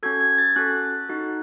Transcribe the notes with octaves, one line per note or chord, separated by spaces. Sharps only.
C#4 F#4 A4 G#6
G#6
A6
C#4 F#4 A4 F#6
D#4 F#4 A4